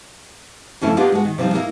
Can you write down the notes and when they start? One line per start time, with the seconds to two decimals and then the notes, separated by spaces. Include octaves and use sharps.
0.81 F2 C#3 F3 A3 C#4 E4
0.97 A#3 B3 D4 D#4 F4 G4
1.12 G#3 F#4
1.25 D#3
1.38 C3 F3 G3 D#4
1.53 A#3 D#4 E4 A4 A#4